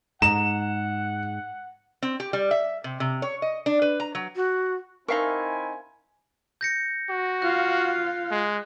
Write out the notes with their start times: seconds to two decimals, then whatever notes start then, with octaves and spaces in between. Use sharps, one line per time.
0.22 G#2 F#5 A#5 E7
2.02 C4
2.20 G4
2.33 G3
2.51 E5
2.84 C3
3.00 C3
3.22 C#5
3.42 D#5
3.66 D4
3.82 B4
4.00 A#5
4.15 F#3
4.36 F#4
5.08 C4 D#4 E4 A#4 E5 F5 G#5 C#6
6.61 G6 A#6 C#7
7.10 F#4
7.42 F4 F5 F#6
8.31 G#3